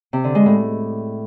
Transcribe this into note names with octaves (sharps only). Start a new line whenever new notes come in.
C3
D3
G#3
A2